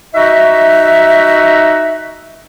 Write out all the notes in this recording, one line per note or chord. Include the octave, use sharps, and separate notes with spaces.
D#4 F#4 E5